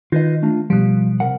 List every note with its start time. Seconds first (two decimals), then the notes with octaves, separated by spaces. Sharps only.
0.12 D#3 F4 B4 D#5
0.42 A3 D4 F4
0.70 B2 F3 G3
1.20 C3 A#4 F#5